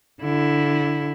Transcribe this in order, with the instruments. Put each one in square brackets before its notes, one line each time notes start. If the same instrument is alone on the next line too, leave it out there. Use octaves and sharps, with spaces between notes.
[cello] D3 E4